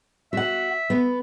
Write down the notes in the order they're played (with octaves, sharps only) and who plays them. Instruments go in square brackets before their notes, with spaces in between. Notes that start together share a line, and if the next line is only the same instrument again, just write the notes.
[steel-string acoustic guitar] F#4 F#5 [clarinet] E5
[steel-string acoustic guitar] B3